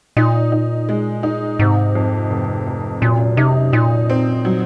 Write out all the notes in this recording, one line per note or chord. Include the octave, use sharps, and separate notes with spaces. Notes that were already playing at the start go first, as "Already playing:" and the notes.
A#2 D#4
D#4
G#3
D#4
G#2 C3
F2
F1
F1
F#2 A#2
C3 D#4
A#2 D#4
C4
F#3